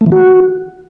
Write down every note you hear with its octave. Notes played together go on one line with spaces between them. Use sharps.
A3
E3
F#4